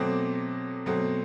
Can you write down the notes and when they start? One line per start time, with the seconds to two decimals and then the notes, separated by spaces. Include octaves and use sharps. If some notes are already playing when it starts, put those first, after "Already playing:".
Already playing: B2 F#3 A3 C4 D6
0.86 B2 F#3 A3 C4